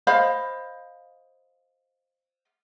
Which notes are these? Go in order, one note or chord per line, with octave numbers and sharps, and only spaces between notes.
C5 D#5 F5 B5